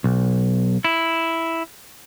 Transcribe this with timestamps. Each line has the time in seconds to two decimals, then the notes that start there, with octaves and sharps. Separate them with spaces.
0.04 B1
0.84 E4